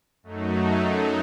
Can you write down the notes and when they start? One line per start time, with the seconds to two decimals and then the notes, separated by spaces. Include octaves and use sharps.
0.23 F#2 F#3 A3 D#4